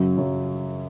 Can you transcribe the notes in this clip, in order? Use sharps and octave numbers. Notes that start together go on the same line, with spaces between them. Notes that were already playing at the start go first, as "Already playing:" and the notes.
Already playing: F#2 C#3 F#3
F#2 C#3 F#3